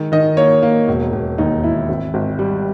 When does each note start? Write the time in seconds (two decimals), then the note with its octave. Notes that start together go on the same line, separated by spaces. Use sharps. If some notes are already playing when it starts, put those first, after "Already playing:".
Already playing: D#3 G#3
0.12 D#3 D#5
0.37 A#3 C#5
0.62 A#3
0.88 E1
1.12 E1
1.38 D#2 D#4
1.64 E1 E4
1.89 G#1
2.14 G#1
2.39 G3